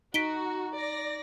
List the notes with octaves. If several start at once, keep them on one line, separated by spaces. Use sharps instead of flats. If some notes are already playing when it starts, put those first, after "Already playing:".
D#4 F#4 B6 D7 G7
D5 A#6